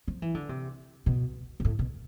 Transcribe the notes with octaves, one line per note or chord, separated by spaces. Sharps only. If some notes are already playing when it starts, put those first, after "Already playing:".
F3
E3
D3
C3
B2
B2
A2
B2